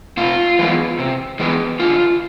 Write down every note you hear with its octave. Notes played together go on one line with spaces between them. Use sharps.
C3 F4
E3 G#3 B3
C3
E3 G#3 B3
D3 F4